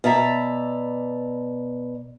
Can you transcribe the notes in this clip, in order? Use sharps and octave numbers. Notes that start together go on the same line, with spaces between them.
B2 D5 E5 A#5